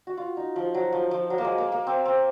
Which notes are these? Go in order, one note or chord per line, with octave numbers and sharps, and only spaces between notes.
F#4
F4
D#4
F3
F#3
F3
F3
F#3
A#3
G#3
A#3
A#3
C4
C4